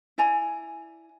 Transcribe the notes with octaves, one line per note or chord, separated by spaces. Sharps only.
E4 D5 G#5 A#5